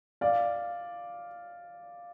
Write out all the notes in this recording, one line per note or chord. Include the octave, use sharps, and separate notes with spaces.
D5 F5